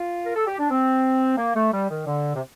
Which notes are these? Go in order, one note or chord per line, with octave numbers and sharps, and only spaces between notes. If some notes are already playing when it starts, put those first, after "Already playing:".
Already playing: F4
A#4
A4
G4
D4
C4
A#3
A3
G3
D#3
D3
C3